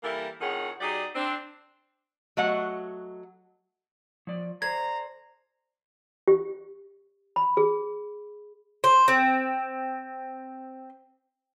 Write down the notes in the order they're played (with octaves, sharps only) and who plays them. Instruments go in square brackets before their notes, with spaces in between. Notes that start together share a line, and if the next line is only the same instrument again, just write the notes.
[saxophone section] E3 G3 A#3 E4 A4 A#4
F2 A2 D#3 C#4 G#4 F#5
F#3 D#4 G4 G#4 D5
C4 D4
[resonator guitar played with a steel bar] F#3 A3 D#5 F#5
[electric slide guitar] F3 D5
[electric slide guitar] A4 C5 D5 [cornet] A#5 [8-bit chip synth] G#6
[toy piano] G4
B5
G#4
[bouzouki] C5
C4